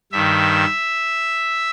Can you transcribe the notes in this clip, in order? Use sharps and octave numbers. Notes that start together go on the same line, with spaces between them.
G2 D#3 E5